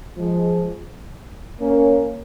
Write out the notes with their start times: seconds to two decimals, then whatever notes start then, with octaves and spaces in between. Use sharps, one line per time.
0.16 F3 G#3
1.60 A#3 C#4